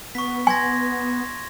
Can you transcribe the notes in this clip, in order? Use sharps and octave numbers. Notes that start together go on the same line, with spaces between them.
B3 C#6 B6
G#5 C6 G#6 A#6